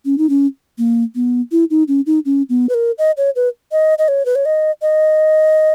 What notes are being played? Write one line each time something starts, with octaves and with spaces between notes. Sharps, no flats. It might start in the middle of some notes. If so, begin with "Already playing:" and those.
C#4
D#4
C#4
A#3
B3
E4
D#4
C#4
D#4
C#4
B3
B4
A#4
D#5
C#5
B4
D#5
D#5
C#5
B4
C#5
D#5
D#5